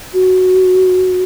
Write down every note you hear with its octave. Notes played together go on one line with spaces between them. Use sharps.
F#4